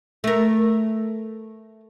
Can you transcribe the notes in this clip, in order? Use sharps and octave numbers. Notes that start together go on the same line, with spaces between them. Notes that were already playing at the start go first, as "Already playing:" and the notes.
A3 A#4